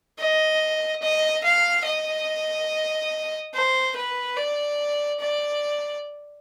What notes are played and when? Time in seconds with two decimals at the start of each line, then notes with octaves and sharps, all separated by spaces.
0.19 D#5
1.02 D#5
1.44 F5
1.86 D#5
3.54 C5
3.96 B4
4.37 D5
5.20 D5